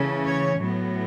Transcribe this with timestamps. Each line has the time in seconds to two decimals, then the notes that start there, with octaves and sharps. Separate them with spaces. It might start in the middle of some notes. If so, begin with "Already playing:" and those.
Already playing: C#3 E3 A3 C#4
0.26 C#5
0.59 A2 F#3 B3